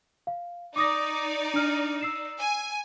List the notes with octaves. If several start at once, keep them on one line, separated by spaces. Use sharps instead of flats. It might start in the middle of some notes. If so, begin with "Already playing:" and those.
F5
D#4 D5 D6 D#6 A#6
D4 F6
E6 C7 E7
G#5